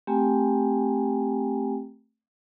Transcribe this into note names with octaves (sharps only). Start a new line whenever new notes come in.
A3 C4 G4 G5 G#5 A#5